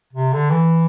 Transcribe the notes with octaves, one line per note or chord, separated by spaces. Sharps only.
C3
D3
E3